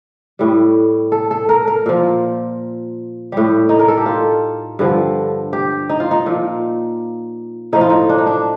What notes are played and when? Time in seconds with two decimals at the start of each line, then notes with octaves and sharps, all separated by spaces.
0.39 A2 G3
1.12 A4
1.31 A4
1.49 A#4
1.67 A#4
1.86 A#2 F3
3.32 A2 G3 G4
3.69 D#4
3.79 A#4
3.88 A4
3.97 G4
4.06 F4
4.79 G2 D3 F3
5.53 G4
5.89 D#4
6.00 F4
6.11 D#4
6.26 A#2 F3
7.73 A2 F3 D#4
7.81 F4
7.90 D#4
8.09 D4
8.18 D#4
8.27 D4